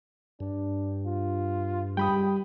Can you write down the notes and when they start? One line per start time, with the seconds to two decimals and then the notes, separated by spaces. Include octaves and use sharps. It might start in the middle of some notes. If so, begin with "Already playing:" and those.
0.40 G2 D4
1.06 F4
1.97 C#2 G3 G5 B5 D#6